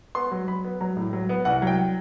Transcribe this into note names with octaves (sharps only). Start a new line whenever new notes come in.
B3 C6
F#3
F#3 B5
B3
F#3 A#5
A2
F#3
B3
C2 F#5
F#3
G5